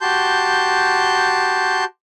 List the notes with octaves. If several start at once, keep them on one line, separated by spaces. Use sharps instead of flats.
F#4 G4 A5 C6 G6